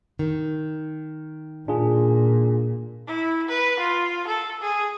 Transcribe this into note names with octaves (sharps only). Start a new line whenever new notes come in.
D#3
A#2 D4 F4 G#4
E4
B4
F4
A4
G#4